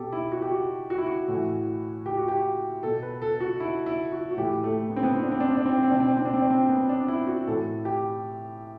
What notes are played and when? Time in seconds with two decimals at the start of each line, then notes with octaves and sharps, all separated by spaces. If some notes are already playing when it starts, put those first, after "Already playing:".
Already playing: B2 G4 A4
0.12 E4
0.32 F#4
0.42 G4
0.51 F#4
0.90 F#4
0.98 E4
1.07 F#4
1.28 A2
1.34 E3
2.06 G4
2.17 F#4
2.28 G4
2.83 B2 A4
3.02 B4
3.22 A4
3.40 F#4
3.60 E4
3.86 E4
4.12 F#4
4.31 F#4
4.37 A2 E3 G4
4.64 A3
4.90 B3
4.96 C4
5.03 B3
5.15 C4
5.23 D4
5.31 C4
5.40 D4
5.49 C4
5.57 D4
5.65 C4
5.74 D4
5.83 C4
5.91 B2 D4
6.00 C4
6.08 D4
6.17 C4
6.25 D4
6.34 C4
6.42 D4
6.50 C4
6.69 B3
6.89 D4
7.08 E4
7.27 F#4
7.47 A2 E3 A4
7.85 G4